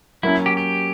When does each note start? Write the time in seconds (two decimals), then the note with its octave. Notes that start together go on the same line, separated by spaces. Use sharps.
0.23 F#3 A#3 C#4 E4
0.46 G4
0.57 G4